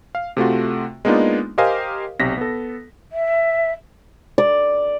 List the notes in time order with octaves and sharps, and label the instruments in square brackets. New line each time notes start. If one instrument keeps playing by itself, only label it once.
[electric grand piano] F5
C3 A3 F4 F#4
G#3 A#3 B3 D4 D#4 F4
G4 A#4 C5 D#5 F5 G#5
B1 C3 A#6 B6
B3 A4
[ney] E5
[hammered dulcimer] D5